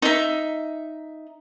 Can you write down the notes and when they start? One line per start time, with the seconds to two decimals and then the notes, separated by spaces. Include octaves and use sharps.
0.02 D#4 E5